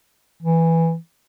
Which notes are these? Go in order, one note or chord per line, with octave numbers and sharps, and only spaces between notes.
E3